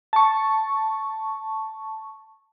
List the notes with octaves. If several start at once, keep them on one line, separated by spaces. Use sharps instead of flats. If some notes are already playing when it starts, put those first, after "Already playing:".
A5 C#6